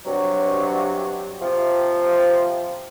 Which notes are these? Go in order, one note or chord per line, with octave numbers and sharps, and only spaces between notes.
G2 C3 F#3
C3 F3